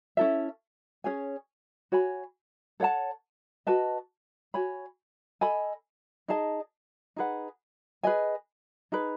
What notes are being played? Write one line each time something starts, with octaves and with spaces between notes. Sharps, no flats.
C#4 E4 A4 E5
C#4 G#4 C#5 G#5
F#4 C#5 G#5 B5
A4 C#5 F#5 A5
F#4 B4 D#5 A5
F#4 C#5 G#5 B5
A4 D#5 G#5 B5
D#4 G#4 D#5 A5
D#4 G#4 B4 F#5
G#4 B4 D#5 G#5
D#4 G#4 B4